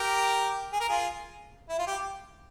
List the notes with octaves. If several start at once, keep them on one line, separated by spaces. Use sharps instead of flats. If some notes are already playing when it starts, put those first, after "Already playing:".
Already playing: G4 A#4
G#4
A#4
F4 G#4
E4
F4
G4